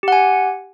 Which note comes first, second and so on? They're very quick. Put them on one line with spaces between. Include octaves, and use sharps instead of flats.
G4 F#5 G#5